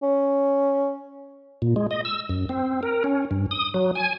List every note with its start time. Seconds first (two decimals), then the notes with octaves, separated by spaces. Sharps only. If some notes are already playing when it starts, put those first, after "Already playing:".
0.03 C#4
1.62 A#2
1.76 G#3
1.91 D#5
2.05 E6
2.29 F#2
2.49 C4
2.83 A#4
3.04 C#4
3.31 G2
3.51 D#6
3.74 F#3
3.95 G#5